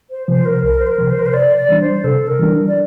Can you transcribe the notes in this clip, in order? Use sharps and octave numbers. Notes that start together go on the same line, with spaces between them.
C5
C3 F3 C5
A#4
C2 A#4
C5
A#4
C3 F3
C5
A#4
C5
C3 D5
D5
E3 G3 D4
C5
C3 A4
A#4
E3 G3 D4
D5